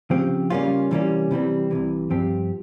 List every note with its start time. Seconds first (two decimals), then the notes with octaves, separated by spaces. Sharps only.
0.10 C#3 F3 C4 G4
0.50 C#3 G3 A#3 C#4 F4
0.91 C3 E3 G3 A#3 C#4
1.31 C3 E3 G3 C4
1.71 C2 C3 E3
2.10 G2 F3 C4 G4